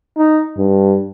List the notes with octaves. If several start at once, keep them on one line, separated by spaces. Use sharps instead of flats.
D#4
G2